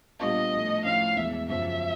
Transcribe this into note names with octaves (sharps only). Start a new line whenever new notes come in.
A#2 G3 B3 D4 F4 D#5
A2 F3 A3
A2 F3 A3 C#4 E4 F5
E2 B2 G#3 E5
F#2 C#3 F3 E5